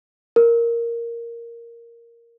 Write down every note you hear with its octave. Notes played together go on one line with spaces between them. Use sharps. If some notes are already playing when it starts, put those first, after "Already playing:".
A#4